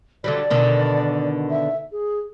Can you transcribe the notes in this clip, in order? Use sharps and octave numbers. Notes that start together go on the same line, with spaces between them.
D3 F#3 G3 D5
B2 D3 D#3
E5
G#4